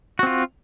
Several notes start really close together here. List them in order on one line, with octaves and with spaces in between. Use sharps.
F#4 C4 F4